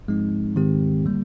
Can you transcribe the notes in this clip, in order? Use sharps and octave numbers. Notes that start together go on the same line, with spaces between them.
G#2 F3 G#3 C4 D#4
G#2 D#3 G#3 C4 G4
D3 G3 A#3